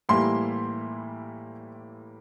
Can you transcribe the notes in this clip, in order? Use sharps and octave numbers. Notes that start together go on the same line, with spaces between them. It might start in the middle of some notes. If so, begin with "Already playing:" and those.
A2 E3 G3 A#3 E4 C6